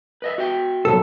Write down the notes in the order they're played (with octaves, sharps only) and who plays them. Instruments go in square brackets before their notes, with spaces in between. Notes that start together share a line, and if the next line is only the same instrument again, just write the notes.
[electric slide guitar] B4 D#5 E5
F#4 E5 G5
[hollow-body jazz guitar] B1 G2 A4